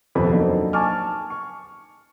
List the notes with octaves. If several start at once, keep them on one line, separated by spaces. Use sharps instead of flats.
D#1 F2 C3 B3 A4 B5
F#3 A#3 C4 D4 D#4 A4
G#5 A5 C#6 D6 F6
C#6